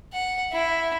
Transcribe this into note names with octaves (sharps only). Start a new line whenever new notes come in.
F#5
E4